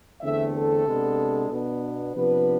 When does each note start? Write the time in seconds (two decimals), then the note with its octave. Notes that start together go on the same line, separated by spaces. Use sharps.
0.21 E2 D3 A3 C4 E5
0.54 A4
0.86 C3 G#3 B3 D4
1.50 B2 B3 D4
2.15 C3 F3 B3 D4 B4